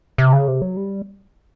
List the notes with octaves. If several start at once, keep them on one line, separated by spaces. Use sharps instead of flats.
C3
C#3
C3
F#3
G3